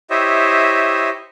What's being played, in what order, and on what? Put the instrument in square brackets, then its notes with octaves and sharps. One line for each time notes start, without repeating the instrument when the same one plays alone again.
[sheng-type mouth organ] E4 G4 C5 C#5 D#5 E5